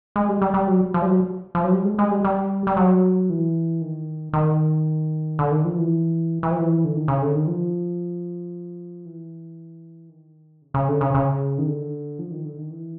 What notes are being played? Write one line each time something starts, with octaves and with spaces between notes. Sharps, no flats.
G#3
G3
G3
G3
F#3
F3
G3
F#3
F3
F#3
G3
G#3
G#3
G3
G3
G3
F#3
E3
D#3
D#3
D3
D#3
F3
E3
E3
F3
E3
D3
D#3
C#3
D3
D#3
F3
E3
D#3
C#3
C#3
D3
C#3
C#3
D#3
D3
F3
D#3
D3
D#3
E3